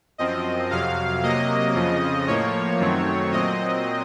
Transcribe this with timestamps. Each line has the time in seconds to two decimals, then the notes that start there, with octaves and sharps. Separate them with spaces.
0.18 F#2 F3 C4 D#5
0.71 F2 C3 F#3 F5
1.23 C3 F#3 A#3 D#5
1.75 F2 C#3 F3
2.27 A2 F3 A#3 C#5
2.80 F#2 D#3 F#3 A3 C4
3.32 A#2 F#3 C4 D#5